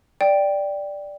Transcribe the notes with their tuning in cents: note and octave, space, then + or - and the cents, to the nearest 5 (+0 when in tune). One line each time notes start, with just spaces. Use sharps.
D5 +0 G5 +0